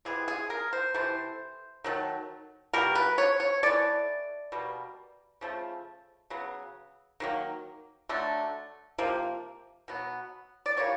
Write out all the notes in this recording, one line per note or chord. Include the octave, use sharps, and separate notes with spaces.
C3 E3 G#3 B3 G#4
G#4
A#4
C5
C3 E3 A3 C5
D#3 F#3 A3
B2 G3 A#3 A#4
B4
C#5
C#5
E3 A3 D5
B2 G3 A#3
C#3 F3 A3
C#3 F#3 B3
D#3 F#3 A#3
D3 F#3 A3
C3 F3 A#3
B2 F#3 B3
D5
E3 G3 A#3 C#5